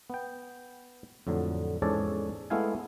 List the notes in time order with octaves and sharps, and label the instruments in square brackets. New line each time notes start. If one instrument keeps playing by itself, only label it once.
[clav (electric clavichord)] B3 G5
F2 A2 D3 F#3
E2 G#2 C#4 A4 C#5 D5
G#3 A3 B3 E4 F5 G#5